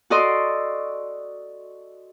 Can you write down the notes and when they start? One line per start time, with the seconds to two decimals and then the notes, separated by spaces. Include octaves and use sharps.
0.10 F#4 A4 D5 D#5 C6